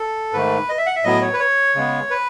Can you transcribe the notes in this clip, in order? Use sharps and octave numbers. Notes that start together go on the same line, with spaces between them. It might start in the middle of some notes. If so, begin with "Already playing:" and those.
Already playing: A4
G#2 D#3 A3 B4
D#5
E5
F#5
E5
A2 F#3 B3 D#5
C#5
B4
C#5
C#3 G#3 B3
B4